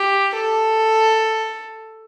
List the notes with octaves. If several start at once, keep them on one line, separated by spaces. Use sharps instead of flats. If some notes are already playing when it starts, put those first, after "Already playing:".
Already playing: G4
A4